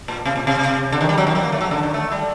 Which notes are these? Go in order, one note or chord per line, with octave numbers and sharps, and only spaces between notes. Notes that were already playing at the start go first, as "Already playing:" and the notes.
A#2
C3
A#2
C3
D3
D#3
G3
F#3
D#3
F#3
A#3
A3
F#3
D3
D#3
A3
G3